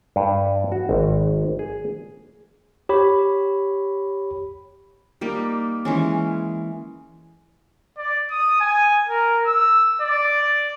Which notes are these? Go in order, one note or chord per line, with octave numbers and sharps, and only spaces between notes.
G2
F#4
G#1
G#4
G4 C#5 B5
G3 A#3 D#4
E3 G#3 C#4
D5
D#6
G#5
A#4
E6
D5